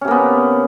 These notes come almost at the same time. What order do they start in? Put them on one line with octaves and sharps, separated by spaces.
C#4 C3 A#3 B3